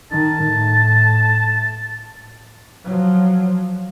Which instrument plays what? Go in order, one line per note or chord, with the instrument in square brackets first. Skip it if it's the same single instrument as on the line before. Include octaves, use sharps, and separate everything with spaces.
[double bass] D#3 [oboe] A5
[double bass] A2
F3 F#3